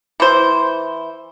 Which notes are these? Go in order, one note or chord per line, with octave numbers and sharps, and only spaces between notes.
E3 C5